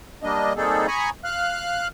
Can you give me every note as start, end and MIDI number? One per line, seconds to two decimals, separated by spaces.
0.23 0.53 55
0.23 0.53 58
0.23 0.53 62
0.23 0.53 75
0.56 0.87 55
0.56 0.87 58
0.56 0.87 60
0.56 0.87 63
0.56 0.87 68
0.56 0.87 69
0.87 1.10 80
0.87 1.10 82
0.87 1.10 83
0.87 1.10 85
0.87 1.10 87
1.24 1.88 77
1.24 1.88 89
1.24 1.88 90